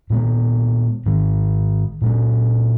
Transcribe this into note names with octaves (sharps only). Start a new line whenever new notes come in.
A#2 G#3 B3
G#2 D#3 G#3
A#2 G#3 C#4